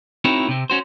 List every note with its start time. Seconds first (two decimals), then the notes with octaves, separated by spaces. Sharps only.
0.25 C4 D#4 E4 F#4 A#4 C#5
0.49 C3 C4
0.70 C#4 F#4 C5